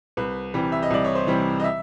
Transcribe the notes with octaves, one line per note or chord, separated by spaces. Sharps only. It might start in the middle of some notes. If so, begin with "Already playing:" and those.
C2 B4
C3 E3 G3
E5
D#5
C2 D5
C#5
C5
C3 E3 G3
D#5
E5